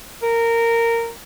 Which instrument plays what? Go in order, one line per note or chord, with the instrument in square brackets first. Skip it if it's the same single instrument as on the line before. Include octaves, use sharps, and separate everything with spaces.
[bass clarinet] A#4